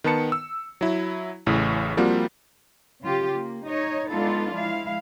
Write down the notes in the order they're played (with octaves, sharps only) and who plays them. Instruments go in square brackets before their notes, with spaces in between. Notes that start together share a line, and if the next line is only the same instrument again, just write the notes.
[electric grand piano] D#3 B3 B4 A5 C#7
E6
F#3 E4
A1 A2 C#3
F3 G3 A#3 C4 F4 F#4
[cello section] C#3 F#3 F4 G4
A#3
D#4 C#5 D#5
G#3 B3 D4 D#4 F4 A4
F3 G#3 E4 F5